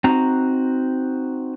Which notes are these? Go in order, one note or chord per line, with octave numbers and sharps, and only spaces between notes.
C4 D#4 F#4 A#5